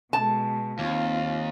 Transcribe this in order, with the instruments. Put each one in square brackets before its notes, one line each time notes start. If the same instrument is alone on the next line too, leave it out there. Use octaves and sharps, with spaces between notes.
[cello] B2 G#3 [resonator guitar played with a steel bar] A5
[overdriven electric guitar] D#2 [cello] C4 F4